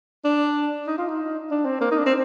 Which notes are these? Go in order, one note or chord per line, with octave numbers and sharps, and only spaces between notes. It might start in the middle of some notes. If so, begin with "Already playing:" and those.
D4
D#4
F4
D#4
D4
C4
A#3
D#4
D4
C4